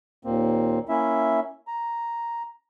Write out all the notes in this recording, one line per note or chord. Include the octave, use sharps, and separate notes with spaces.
D#2 A#2 A#3 C4
A#3 C#4 E4 E5
A#5